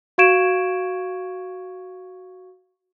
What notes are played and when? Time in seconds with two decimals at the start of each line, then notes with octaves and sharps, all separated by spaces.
0.18 F#4 F5 C#6 G#6 D7 E7